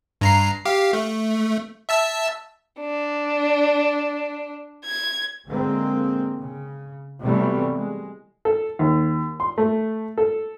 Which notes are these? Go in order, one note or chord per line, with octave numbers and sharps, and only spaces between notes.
G2 A#5 C7
G4 F5
A3
E5 A5 E6
D4
G#6
D3 G#3 A#3 C4
C#3
C3 E3 F#3 G3 A3 B3
G#3
A4
D#2
C6
A3
A4